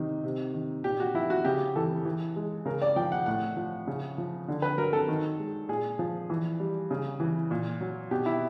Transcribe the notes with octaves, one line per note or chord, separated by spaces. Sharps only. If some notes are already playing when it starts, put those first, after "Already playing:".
Already playing: C3 D#3 D#4
C3
D#3
A#2 G4
F#4
F3 E4
F#4
C#3 G4
E3 A4
E3
G#3
C#3 A#4
D5
F3 G5
F#5
A2 F#5
F3
C#3
F3
D3
B4
F#3 A#4
A4
D#3
G#3
A#2 G#4
F3
E3
G3
C#3
E3
A#2
F#3
B2 G4
E4